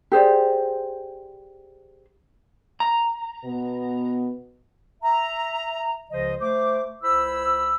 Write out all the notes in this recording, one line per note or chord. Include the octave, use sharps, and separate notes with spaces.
G4 G#4 C5 D5
A#5
B2 B3
E5 A#5
C#2 C#3 F3 C5 D#5
A3 C5 D6
C#2 E4 C5 B5 E6